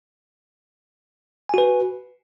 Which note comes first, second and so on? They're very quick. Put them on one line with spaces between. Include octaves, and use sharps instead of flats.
G#5 F#4 B4